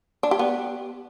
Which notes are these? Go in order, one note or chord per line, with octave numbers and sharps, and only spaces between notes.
D4
G4
B3